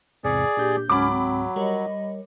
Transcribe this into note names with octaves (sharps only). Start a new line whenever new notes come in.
E2 G#2 C3 G#4 D5
A#2 D4 G4 G6
C#2 G#2 F#3 C#4 B5 D6
C4
G3 A#4 C#5 D#5